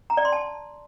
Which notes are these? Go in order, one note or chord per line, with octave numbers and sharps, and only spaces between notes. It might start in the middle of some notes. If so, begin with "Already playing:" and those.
A#5
D5
C6
A5